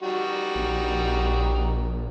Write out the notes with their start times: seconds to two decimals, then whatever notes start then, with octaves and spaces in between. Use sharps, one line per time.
0.03 G3 D#4 F#4
0.55 A#1